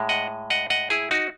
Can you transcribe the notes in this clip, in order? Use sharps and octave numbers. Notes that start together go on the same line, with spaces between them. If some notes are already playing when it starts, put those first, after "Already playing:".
Already playing: A2 G#3
D#5 F#5
D#5 F#5
D#5 F#5
E4 G#4
D#4 F#4